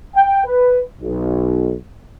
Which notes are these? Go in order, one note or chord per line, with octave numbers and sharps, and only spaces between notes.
G5
B4
B1